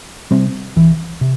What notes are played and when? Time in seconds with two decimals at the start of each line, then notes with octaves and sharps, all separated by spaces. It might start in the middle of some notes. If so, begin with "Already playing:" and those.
0.31 C3 G3 C4
0.76 C2 E3
1.21 C3